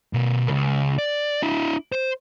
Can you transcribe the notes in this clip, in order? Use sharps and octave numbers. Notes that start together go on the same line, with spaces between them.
B2 A#4
C#2
D5
D4 E4
C5